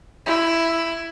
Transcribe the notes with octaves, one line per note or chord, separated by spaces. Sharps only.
E4